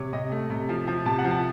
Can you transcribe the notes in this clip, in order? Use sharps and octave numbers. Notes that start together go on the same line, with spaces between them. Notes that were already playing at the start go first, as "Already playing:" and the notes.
Already playing: C3 C#5
C3 D#5
A3
C3
F3
F3
C3 A5
F#5
F3
A5